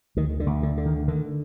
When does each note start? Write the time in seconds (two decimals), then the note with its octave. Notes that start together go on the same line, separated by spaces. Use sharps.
0.17 D2 D#3
0.40 D3
0.47 D2
0.63 D3
0.78 D3
0.86 D#3
1.08 D3 D#3